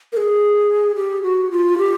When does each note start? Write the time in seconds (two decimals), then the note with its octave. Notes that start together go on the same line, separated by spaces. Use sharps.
0.13 A#4
0.17 G#4
0.95 G4
1.22 F#4
1.51 F4
1.78 G4